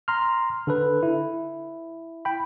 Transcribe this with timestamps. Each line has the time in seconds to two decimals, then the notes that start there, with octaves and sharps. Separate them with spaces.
0.08 A#5 C6 F6
0.67 D3 A4 B4
1.03 E4
2.25 G5 B5